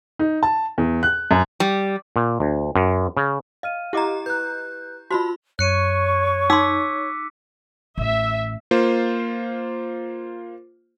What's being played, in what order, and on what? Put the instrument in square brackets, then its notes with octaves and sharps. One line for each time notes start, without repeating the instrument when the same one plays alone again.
[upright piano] D#4
A5
E2
F#6
F#2
[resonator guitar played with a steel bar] G3
[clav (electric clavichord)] A#2
D2
F#2
C#3
[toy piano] D#5 [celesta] F5 F6 D#7
[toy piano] E4 F#5 D6 [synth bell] G4 D#5 A#5
[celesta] B4 F#6 [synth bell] G6
[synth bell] F4 B5 C6 [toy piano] F#4 C5 [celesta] A5
[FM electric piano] F#2 [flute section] C#5 C#6 [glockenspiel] F#6 C#7 D#7
[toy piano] D#4 C6 [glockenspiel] D6 E6 B6
[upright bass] A1 [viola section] E5
[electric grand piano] A#3 F4 C5